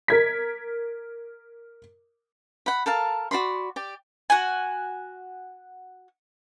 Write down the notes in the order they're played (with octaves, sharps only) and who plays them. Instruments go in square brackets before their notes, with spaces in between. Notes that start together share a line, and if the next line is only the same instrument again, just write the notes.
[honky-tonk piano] A#4 G#6 B6
[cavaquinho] F#5 B5
A4 A#4 F5 A5
F#4 D5 B5 C6
G4 D5
[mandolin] F#4 G#5